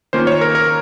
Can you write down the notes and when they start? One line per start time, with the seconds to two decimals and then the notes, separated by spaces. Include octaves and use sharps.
0.13 D#3 A#3 C#4 F4 C5
0.27 C#5
0.41 A#4
0.55 A#4